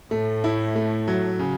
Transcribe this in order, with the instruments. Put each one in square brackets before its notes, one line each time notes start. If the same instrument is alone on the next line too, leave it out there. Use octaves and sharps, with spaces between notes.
[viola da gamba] A2 [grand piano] A3
[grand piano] E4
A3
F#3
C#3